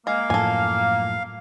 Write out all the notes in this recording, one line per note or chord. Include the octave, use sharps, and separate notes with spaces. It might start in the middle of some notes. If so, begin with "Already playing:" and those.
G#3 A#3 F5
F#2 A2 F3 A4 G#5